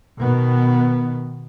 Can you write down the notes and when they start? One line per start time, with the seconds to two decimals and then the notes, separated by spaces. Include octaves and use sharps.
0.20 B2 D#3 B3